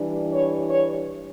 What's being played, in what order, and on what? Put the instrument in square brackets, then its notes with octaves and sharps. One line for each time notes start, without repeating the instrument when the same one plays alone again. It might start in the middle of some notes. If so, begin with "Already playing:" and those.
Already playing: [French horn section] E3 G3 D4
C#5
C#5